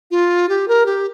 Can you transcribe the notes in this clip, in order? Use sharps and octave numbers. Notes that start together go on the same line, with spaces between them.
F4
G4
A#4
G4